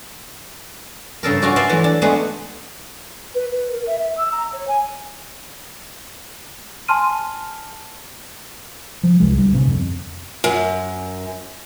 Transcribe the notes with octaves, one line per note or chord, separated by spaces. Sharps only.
G2 C#3 A4 A#4
C#4 D4 F4 F#4 D5
B4 D5 E5 F5 G#5 C6
E3 F#3 A3
D4
G#3 A3 B3 D4 G#4 B4
B4
B4
A#4
E5
E5
E6
A#5
C#5
G#5
G#5 A5 C6 F6 D#7
F3
E1 C2 G#3
B1 D3 G3
A2 C3 B3 C#4
F2 C4
F#2